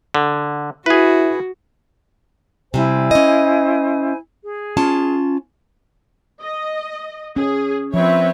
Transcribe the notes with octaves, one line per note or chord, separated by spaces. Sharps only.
D3
E4 F#4 G#4 B4
C3 G3 E4 C5 G#5
C#4 D#5
G#4
C#4 F4 A5
D#5
C#4 G#4
F3 C4 B4 C#5 E5